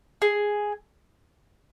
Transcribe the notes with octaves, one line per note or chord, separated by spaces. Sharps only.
G#4